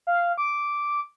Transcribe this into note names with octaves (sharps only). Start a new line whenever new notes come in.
F5
D6